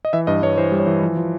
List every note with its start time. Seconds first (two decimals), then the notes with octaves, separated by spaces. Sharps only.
0.05 D#5
0.13 E3 E5
0.27 G2 D#5
0.43 G2 C#5
0.58 E3 C5
0.72 G3
0.80 C#5
0.87 E3
1.02 F3
1.17 F3